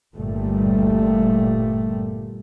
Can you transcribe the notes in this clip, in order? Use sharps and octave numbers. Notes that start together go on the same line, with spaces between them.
G1 A#2 G3 A3